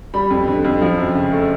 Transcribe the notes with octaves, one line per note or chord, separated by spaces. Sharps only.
G3 B5
F2
D3
F2
F3
F#2
C#3
A3